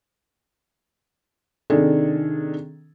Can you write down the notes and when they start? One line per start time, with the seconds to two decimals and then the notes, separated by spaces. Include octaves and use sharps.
1.70 C3 D#3 D4 G#4 A4